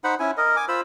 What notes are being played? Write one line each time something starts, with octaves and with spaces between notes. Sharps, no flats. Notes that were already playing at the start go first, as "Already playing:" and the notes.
D#4 C5 F#5 B5
C#4 E4 G#5
A#4 D#5
G#5 D6
F4 C5 B5 E6